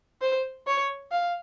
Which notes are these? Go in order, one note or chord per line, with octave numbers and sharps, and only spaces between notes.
C5
C#5
F5